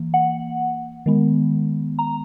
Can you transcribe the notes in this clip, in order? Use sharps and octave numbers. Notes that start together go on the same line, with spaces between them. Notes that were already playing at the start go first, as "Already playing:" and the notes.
Already playing: E3 A#3
F#5
D#3 G#3 B3
A#5